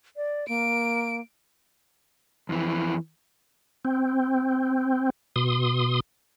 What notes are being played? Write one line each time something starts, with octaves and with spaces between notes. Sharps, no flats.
D5
A#3 D7
F2 E3
C4
B2 C6 D#6